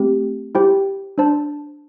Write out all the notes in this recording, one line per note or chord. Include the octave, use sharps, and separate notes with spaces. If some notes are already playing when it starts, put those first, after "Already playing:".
Already playing: A3 C4 G4
E4 G4 C5 G5
D4 C5 A5